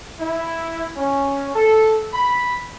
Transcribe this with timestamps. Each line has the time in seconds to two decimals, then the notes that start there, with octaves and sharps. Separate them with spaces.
0.18 E4
0.96 C#4
1.53 A4
2.11 B5